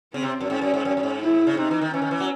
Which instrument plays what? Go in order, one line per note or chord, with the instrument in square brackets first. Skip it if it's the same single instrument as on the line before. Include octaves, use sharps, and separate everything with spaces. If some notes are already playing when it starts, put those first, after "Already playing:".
[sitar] C#3 [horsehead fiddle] C4
[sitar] C3
F#2
[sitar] G#2 [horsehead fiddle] C#4
[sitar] F#2
G#2
F#2
F#2
G#2
[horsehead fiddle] E4
[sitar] C#3
[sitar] C3 [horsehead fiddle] D#4
[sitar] E3
D#3
[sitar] E3 [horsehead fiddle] C#4
[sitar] D#3
E3
F#3